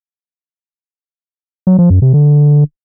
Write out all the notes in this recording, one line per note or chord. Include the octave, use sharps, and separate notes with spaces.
F#3
F3
F#2
C3
D3